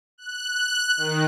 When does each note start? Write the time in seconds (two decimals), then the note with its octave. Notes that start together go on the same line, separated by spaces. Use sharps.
0.18 F#6
0.51 F#6
0.97 D#3